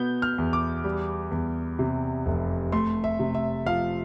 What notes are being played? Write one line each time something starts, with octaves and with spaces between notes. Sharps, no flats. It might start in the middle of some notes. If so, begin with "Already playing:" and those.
Already playing: B2 B3 G6
F6
E2
D6
G3
E2
C3
F1
A3 C6
E5
C3
E5
F3 F5